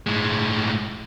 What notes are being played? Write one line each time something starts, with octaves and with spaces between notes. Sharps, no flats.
A2 G#3